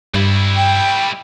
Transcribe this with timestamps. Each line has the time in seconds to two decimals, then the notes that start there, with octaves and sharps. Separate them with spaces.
0.14 G2 G3 E4
0.56 G5